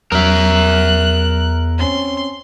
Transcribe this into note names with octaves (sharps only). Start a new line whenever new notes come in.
E2 F#3 A#4 E5 F#6
C4 C#4 C6